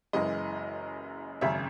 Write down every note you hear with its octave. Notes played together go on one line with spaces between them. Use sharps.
F#1 F#2 E3 G#3 D#5
G#1 F#2 C#3 E5